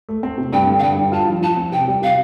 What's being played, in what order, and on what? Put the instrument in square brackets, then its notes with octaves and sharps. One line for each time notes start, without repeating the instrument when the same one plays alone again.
[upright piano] A3
C4
C3
[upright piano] G2 [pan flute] G5
[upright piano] D3
[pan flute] F5
[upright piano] G2 [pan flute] G5
[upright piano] G2
[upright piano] F4 [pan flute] A5
[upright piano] F3
[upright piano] F3 [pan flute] A5
[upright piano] C4
[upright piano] C3 [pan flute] G5
[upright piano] G3
[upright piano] C3 [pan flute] F5